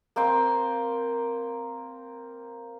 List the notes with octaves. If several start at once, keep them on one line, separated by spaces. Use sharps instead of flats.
A#3 C4 G5 C6